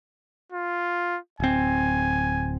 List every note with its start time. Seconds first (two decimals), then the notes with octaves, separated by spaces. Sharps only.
0.52 F4
1.40 D1 C4 G#5